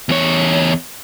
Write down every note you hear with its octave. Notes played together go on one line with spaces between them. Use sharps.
E2 C#5